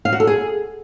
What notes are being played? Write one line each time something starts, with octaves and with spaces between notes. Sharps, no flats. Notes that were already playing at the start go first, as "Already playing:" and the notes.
F5
F#4
A4
G#4